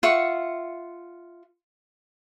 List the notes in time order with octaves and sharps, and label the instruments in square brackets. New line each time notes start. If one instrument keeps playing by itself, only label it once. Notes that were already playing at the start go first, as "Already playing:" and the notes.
[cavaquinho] F4 E5 F#5 C#6